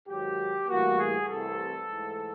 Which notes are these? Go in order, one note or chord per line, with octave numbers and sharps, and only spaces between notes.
G#2 D#3 F#3 G4
A2 E3 G3 A#3 F#4
G#4
C2 C3 E3 A3 A4
G#2 E3 A3